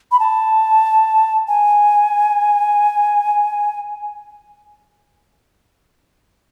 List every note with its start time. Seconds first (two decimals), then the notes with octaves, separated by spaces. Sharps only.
0.12 B5
0.20 A5
1.48 G#5